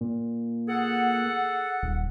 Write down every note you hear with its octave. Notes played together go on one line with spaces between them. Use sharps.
A#2
G#4 A4 F#5
D#1